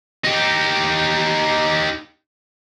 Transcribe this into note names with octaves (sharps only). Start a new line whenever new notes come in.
D#4 G4